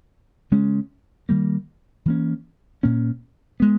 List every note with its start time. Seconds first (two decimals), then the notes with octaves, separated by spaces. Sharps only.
0.51 C#3 G#3 C#4
1.29 D#3 G3 A#3
2.06 E3 A#3 C#4
2.83 A#2 A#3 C#4
3.60 G#3 B3